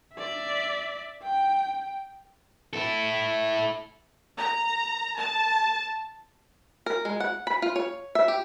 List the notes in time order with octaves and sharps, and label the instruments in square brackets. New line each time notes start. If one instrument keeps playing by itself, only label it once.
[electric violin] D5 E5
G5
[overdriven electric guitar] E4 A4
[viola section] A#5
A5
[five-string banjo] A#4
G#3
F#5
B5
F4
C#5
E5
G4